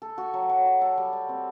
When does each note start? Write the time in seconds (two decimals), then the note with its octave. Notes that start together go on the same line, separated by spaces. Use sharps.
0.02 A4
0.18 F#4
0.34 F#3
0.49 F#3
0.66 F#4
0.81 A4
0.98 G3
1.13 G3
1.29 C4